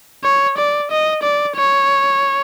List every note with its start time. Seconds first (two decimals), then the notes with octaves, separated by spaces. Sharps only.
0.24 C#5
0.57 D5
0.91 D#5
1.23 D5
1.57 C#5